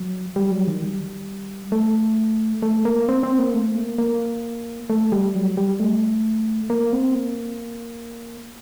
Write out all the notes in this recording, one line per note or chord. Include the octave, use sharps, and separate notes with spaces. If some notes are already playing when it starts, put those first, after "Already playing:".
Already playing: F#3
G3
F#3
D#3
G3
A3
A3
A#3
C4
C4
A#3
A3
A#3
A#3
A3
G3
F#3
G3
A3
A#3
C4
A#3